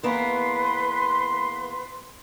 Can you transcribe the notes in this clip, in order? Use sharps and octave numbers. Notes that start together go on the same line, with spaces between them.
E2 A#3 B3 B4 C6